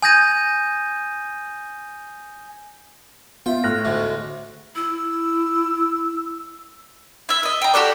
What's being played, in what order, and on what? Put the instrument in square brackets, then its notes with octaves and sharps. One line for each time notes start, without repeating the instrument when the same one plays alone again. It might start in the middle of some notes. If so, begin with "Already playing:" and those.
[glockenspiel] G#5 D#6 G6 G#6 A#6 D#7
[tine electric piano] B3 E5 [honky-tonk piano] F4 [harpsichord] G5
[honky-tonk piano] A2 [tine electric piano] F6 F#6 A#6
[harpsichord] D2 G#2
[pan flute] E4 [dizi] E6
[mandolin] E4 E5
D#5 E5
G5 A#5
F#4 G4 A4 D5